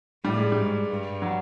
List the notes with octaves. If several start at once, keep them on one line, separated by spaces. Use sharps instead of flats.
A2 G3
G#3
G#2 G3
G2
F#3